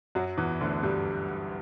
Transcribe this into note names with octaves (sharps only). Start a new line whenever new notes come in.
F#2 F#3
E2 E3
D2 D3
G2 G3